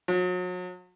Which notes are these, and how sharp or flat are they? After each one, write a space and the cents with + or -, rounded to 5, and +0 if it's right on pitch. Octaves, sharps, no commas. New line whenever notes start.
F#3 -40